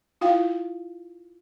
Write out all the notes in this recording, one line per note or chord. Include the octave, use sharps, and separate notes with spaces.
E4 F4 F5 G5